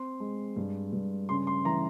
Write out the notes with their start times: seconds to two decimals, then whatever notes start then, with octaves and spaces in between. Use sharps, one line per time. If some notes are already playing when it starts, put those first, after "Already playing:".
Already playing: C4 C6
0.20 G#3
0.56 G2
0.93 G2
1.29 C#3 C6
1.47 C6
1.65 E3 A#5